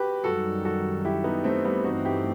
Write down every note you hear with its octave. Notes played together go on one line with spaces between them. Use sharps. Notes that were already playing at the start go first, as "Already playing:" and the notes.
Already playing: F#4 G4 B4
F#2 D#3 G3 F#4 A4
F#4 A4
E4 G4
B3 D#4
A3 C4
G3 B3
G2 E3 A3 C4 D#4 F#4
E4 G4